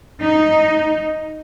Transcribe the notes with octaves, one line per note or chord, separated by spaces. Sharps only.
D#4